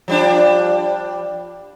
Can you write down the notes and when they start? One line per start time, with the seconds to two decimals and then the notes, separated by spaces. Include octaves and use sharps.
0.08 F3 G3 D4